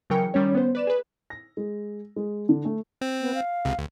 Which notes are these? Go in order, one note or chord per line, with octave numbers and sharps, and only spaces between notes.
C#3 E3 F#3 A#4 G5 C#7
D#3 G3 C#4 C#5
B3 C5
B4 D5 E7
G#4 B4
A#6
G#3
G#3
D3
A3
C4
B3
F5
C#2 C3
D2